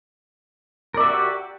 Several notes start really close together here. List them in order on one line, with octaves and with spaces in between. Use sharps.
A#4 D5 E5 F#4 G4